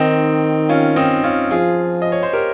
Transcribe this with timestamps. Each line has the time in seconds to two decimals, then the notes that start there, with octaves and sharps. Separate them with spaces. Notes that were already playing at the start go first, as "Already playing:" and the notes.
Already playing: D#3 C4 D#4
0.69 C#4 F4
0.96 C4 D#4
1.24 C#4 F4
1.51 F3 F4 G#4
2.02 D#5
2.12 C#5
2.23 C5
2.33 G4 A#4